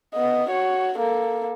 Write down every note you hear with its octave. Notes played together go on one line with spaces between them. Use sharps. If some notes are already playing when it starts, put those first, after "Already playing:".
B3 D#5
F#4 C#5
A#3 A4